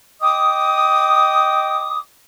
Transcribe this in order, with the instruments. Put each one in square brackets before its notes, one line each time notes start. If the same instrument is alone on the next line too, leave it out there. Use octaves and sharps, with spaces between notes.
[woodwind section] D#5 G5 D6 D#6